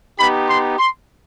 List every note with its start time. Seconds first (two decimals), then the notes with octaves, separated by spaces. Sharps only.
0.18 B3 D#4 G4 B5
0.48 C6
0.79 C6